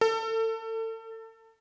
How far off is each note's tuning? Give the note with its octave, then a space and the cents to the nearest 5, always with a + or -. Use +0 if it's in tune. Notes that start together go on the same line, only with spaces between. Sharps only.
A4 +30